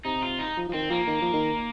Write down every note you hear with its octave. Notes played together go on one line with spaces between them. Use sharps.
C3 D#4
F4
D#4
F3
F3
D#3 C4
F3 A#3
D#3
F3
D#3